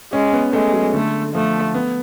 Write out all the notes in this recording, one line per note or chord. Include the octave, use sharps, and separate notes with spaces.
G#3 C#4
B3
G#3 A3
F#3
D3 A3
F3 A3
B3